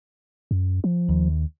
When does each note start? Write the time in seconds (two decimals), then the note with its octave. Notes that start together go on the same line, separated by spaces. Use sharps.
0.51 F#2
0.84 F3
1.09 D#2